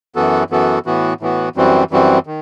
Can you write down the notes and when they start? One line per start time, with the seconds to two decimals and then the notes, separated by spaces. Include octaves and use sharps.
0.15 F#2 E3 B3 F#4 A4
0.50 F#2 E3 B3 F#4 A4
0.86 A2 E3 B3 F#4
1.21 A2 E3 B3 F#4
1.56 F#2 E3 G3 C4 F#4
1.91 F#2 E3 G3 C4 F#4
2.26 D#3